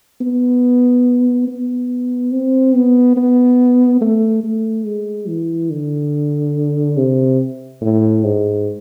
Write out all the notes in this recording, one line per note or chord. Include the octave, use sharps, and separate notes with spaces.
B3
B3
C4
B3
B3
A3
A3
G#3
E3
D3
C3
A2
G#2